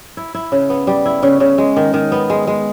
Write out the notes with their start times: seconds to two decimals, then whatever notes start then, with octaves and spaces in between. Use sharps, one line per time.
0.17 E4
0.34 E4
0.52 C#3
0.70 B3
0.87 G3
1.06 E4
1.23 C#3
1.40 C#3
1.58 G#3
1.76 D#3
1.94 D#3
2.12 B3
2.30 G#3
2.47 G#3